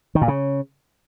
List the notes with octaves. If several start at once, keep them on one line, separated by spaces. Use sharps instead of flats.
D#3
A#2
C#3